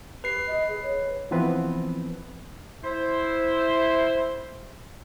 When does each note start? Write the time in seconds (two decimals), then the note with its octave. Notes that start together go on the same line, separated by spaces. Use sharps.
0.24 G4 B4 C7
0.47 D#5
0.68 G#4
0.83 C#5
1.31 E3 F3 B3 C4 B4
2.83 E4 C5